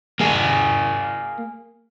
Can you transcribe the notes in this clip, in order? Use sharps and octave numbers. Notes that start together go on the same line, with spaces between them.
A#3 G#4